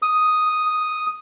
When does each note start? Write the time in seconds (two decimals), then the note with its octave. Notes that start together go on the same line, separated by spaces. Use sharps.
0.02 D#6